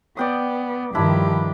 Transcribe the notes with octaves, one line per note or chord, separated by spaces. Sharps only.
B3 D5 G5 D#6
G2 D#3 F3 D4 E4 G4 B5